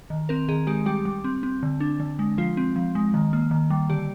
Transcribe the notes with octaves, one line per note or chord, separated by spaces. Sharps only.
D#3
C4 A#4
D#3 G#4
G#3 G4
G3 G4
G3
C4
C4
D3
D4
D3
G#3
F3 F4
C4
F3
G#3
D#3
A#3
D#3
G3
D3 G4